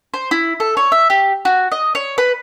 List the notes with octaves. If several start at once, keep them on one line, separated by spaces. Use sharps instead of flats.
C5
E4
A4
C#5
E5
G4
F#4
D#5
C#5
B4